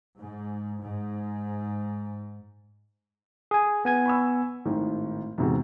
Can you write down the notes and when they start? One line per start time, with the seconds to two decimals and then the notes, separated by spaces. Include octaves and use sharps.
0.18 G#2
0.82 G#2
3.51 G#4 G#5
3.85 B3 G#5 G#6
4.06 B5 C#6 E6
4.66 G#1 A2 D#3
5.38 E2 G#2 C3 F#4